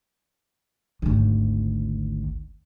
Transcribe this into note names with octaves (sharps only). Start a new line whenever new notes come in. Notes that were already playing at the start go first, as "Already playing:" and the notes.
G#1 D2